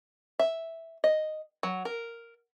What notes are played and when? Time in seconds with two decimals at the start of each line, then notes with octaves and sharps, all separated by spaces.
0.39 E5
1.04 D#5
1.63 F#3
1.85 A#4